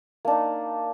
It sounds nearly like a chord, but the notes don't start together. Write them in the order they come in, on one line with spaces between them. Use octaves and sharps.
A#3 D4 D#4